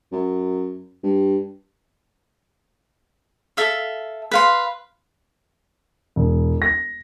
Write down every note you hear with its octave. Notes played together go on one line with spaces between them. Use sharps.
F#2
G2
A4 E5 F5
B4 F5 C6
E1
A#6